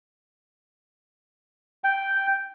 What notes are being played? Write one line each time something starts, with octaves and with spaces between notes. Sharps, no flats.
G5